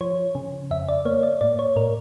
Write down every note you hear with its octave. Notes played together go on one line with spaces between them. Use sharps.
F3 C#5
C#3
F2 E5
D5
A#3 C#5
D5
A2 D5
C#5
A2 A#4